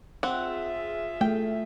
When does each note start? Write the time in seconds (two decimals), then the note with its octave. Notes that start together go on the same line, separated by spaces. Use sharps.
0.23 C4 F4 G#4 E5 F#5
1.21 A3 G5